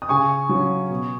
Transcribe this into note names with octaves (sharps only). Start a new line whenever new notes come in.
D#6
C#3 G#5 C#6
F#3 C#4
B2